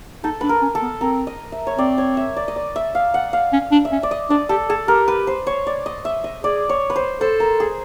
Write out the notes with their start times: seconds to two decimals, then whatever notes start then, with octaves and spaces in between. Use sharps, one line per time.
0.23 D#4 A4
0.41 D4 B4
0.49 A#4
0.62 C#4
0.75 A4
0.82 B3
1.01 C4 A#4
1.27 D#5
1.52 E5
1.67 C#5
1.78 C4 D5
1.98 C#5
2.17 E5
2.36 D5
2.48 D#5
2.56 D5
2.76 E5
2.95 F5
3.14 F#5
3.33 F5
3.53 C#4
3.72 D4
3.85 E5
3.92 C#4
4.03 D5
4.11 D#5
4.30 D4 D5
4.49 G4 A4
4.69 G#4 A4
4.88 G4 A#4
5.08 B4
5.27 C5
5.47 C#5
5.67 D5
5.86 D#5
6.05 E5
6.24 D#5
6.43 G#4 D5
6.69 C#5
6.90 B4
6.96 C5
7.21 A4 C5
7.40 A#4
7.60 G#4